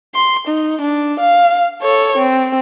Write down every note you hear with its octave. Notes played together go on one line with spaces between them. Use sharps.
C6
D#4
D4
F5
A4 C#5
C4